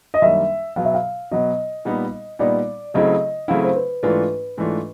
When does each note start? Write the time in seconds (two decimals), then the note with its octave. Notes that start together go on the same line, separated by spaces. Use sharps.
0.14 D#5
0.22 F#2 D#3 G3 A#3 D4 E5
0.76 B2 F#3 B3 F5
0.85 E5
0.94 F5
1.31 B2 F#3 B3 D#5
1.85 A#2 G3 B3 D#4
2.39 A#2 G3 B3 D#4 D5
2.94 C#3 F#3 A3 C4 E4 D#5
3.48 C#3 F#3 A3 C4 E4 F5
3.64 C5
3.76 B4
4.03 G#2 E3 A3 D4 F4 B4
4.58 G#2 E3 A3 D4 F4